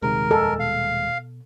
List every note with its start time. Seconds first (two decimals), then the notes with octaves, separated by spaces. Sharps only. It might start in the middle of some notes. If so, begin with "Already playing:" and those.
0.02 D#1 C2 C3 D#3 G#3 A#4
0.31 F2 A4 D#5 G#5
0.60 B2 F5